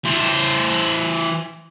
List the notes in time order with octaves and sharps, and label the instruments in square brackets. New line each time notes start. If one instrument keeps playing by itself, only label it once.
[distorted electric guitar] E3 C5